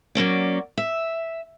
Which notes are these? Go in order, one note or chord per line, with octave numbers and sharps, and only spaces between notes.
F#3 A#3 C#4 D5
E5